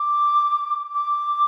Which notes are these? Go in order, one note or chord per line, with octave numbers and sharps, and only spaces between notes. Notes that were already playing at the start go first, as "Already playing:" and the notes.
Already playing: D6
D6